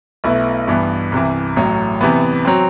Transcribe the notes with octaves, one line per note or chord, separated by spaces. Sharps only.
B1 B2 A3 E4 B4
G2 E3 B3
C2 C3 E3
A1 A2 F#3
C3 E3 B3
F#3 C4